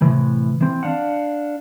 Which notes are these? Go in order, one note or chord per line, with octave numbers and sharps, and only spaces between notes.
A2 C3 E3 G3
E3 C4
D4 F5 F#5